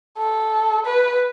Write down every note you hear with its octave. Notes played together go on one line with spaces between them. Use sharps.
A4
B4